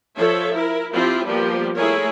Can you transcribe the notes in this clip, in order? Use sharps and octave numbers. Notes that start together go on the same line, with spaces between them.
F3 A4 C#5 E5
E4 A#4
F3 C4 E4 F4 G4
F3 G3 A#3 B3 G4
A3 E4 G#4 A#4 C#5